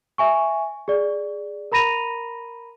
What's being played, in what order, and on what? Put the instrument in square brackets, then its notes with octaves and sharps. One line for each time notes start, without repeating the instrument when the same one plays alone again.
[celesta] E5 G#5 C#6
G#4 D5
A#4 A#5 B5 A#6 D#7 F7